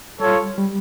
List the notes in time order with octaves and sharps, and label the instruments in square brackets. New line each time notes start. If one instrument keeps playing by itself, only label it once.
[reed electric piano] G3 [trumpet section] F4 A4 C#5
[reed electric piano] G3